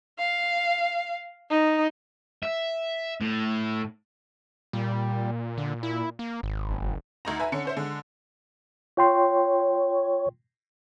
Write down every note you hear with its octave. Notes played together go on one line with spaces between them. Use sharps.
F5
D#4
E5
A2
A#2 G3
D3
E4
A#3
G#1
F#1
D2 D#4 A#5
B4 E5 G#5 A#5
D3 C#4 C#7
C#4 C5 E5
D3 G#3
F4 C#5 G5 C6